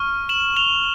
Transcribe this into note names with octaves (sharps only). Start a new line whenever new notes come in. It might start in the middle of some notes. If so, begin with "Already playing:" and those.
Already playing: C#6 F6
E7 F#7
F7 G7